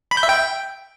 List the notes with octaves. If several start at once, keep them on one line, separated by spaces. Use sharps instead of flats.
B5
G6
E5
G5